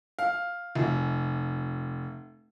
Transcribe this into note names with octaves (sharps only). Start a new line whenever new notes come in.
F5
F1